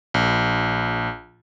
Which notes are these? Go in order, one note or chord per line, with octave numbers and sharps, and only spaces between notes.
A#1